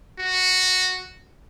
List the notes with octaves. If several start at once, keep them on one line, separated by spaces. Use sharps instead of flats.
F#4